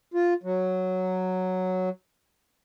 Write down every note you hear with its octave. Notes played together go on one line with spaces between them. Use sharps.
F4
F#3